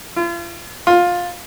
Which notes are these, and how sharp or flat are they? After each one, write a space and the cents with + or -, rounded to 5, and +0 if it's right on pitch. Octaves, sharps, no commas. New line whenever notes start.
F4 -40
F4 +15